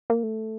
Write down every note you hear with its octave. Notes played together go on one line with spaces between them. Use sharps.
A#3
A3